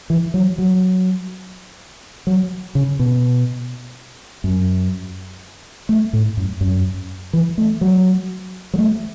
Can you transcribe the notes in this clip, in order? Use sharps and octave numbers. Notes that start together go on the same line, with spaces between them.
E3
F#3
F#3
F#3
C#3
B2
F#2
A3
A2
F#2
F#2
E3
A3
F#3
F#3
A3